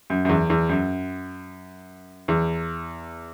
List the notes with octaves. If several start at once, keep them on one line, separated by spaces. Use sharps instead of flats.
F#2
F#2
E2
E2
F#2
E2